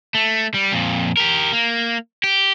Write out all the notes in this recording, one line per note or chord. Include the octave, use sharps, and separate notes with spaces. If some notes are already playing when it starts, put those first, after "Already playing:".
A3
G3
F2 A#2
G4 A#4
A#3
G4